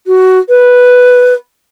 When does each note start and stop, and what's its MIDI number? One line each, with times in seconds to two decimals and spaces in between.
0.06 0.38 66
0.49 1.34 71